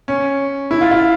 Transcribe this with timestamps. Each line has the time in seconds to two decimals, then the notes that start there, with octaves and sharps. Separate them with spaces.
0.08 C#4
0.71 E4
0.81 F4
0.91 F4